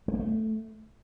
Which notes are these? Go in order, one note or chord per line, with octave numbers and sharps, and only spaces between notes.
G#3
A#3
A3